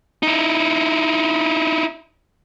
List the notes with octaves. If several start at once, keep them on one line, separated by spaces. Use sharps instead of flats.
D#4 E4